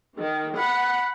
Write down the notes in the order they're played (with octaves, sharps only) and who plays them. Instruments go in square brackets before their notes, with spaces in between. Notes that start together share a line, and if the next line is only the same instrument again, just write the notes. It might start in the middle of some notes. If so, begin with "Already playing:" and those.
[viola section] D#3
[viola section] F#5 [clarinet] B5